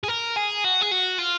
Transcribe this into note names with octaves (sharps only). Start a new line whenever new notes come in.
G#4
A#4
G#4
F#4
G#4
F#4
F4